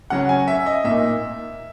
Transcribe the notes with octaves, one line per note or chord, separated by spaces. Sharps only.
C#3 F#3 C#4 F#5
G#5
E5
D#5
A#2 A#3 D#4 E5